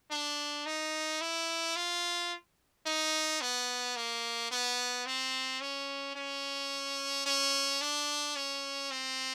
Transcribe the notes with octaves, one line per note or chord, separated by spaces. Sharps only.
D4
D#4
E4
F4
D#4
B3
A#3
B3
C4
C#4
C#4
C#4
D4
C#4
C4